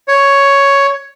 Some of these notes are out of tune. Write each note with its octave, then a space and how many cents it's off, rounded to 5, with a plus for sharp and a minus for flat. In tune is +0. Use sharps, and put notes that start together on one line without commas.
C#5 +5